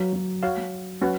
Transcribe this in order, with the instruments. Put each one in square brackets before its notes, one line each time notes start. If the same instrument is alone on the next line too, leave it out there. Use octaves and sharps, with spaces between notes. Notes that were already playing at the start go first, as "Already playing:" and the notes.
Already playing: [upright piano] F#3 [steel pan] B4 F5
[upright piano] F#3
[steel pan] F#4 C#5 F5
[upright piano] F#3
[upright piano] F#3 [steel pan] C#4 F#4 B4